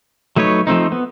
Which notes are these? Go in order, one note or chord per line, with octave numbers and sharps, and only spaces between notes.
F#3 A3 D#4 B4 C#5
F3 A3 C4 D#4
B3